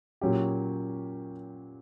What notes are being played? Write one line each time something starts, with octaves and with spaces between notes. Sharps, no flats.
A#2 F#3 C#4 G4